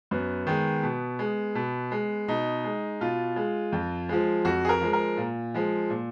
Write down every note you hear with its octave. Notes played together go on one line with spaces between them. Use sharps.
F#2 B3
D#3 G#3
B2
G#3
B2
G#3
B2 D#4
G#3
B2 F4
G#3
F2
F3 G#3
F2 F#4
G#4
A#4
F3 G#3
A#4
A#2
F3 G#3
A#2